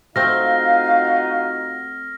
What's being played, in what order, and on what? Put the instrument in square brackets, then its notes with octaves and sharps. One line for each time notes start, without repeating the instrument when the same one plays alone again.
[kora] A3 C4 [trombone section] D#4 F4 F#4 [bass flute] F5 [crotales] F6 A#6